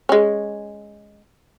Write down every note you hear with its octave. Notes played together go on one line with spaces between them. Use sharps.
G#3 C#4